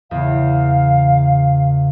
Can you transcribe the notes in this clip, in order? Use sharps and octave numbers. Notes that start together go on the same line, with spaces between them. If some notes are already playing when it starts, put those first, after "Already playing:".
E2 C#3 F5